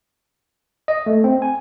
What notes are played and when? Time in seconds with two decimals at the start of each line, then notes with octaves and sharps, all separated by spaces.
0.88 D#5
1.06 A3
1.24 C4
1.42 G#5